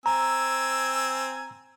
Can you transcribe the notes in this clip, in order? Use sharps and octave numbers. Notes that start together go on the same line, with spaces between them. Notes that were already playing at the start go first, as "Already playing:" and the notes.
C4 G#5 A#5 E6